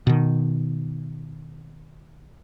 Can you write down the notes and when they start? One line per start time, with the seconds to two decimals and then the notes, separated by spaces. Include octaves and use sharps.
0.07 B2 D#3